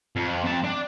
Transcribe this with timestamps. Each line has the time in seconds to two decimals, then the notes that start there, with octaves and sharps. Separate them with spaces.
0.16 F2
0.43 F2 A5
0.64 D4